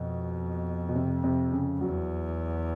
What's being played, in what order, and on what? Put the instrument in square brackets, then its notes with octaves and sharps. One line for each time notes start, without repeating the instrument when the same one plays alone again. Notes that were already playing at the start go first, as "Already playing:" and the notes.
Already playing: [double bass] F2 [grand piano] B2
[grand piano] B2
C3
C3
C#3
[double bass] E2 [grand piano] F#3